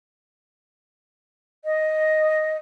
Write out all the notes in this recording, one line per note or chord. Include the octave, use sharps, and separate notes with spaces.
D#5